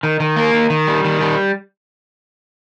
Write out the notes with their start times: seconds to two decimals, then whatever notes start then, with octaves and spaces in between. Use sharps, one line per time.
0.03 D#3
0.20 D#3
0.36 A#3
0.54 D#3
0.70 D#3
0.87 G3
1.05 D#3
1.21 G3